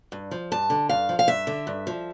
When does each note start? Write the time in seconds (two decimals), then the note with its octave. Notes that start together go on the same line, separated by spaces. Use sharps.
0.12 G2
0.31 F3
0.52 G2 A5
0.70 D3
0.89 G2 F5
1.09 F3
1.19 F5
1.28 G2 E5
1.47 D3
1.67 G2
1.87 F3